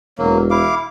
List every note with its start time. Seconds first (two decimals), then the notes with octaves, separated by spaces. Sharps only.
0.18 E1 F#3 A#3
0.51 E4 F5 D6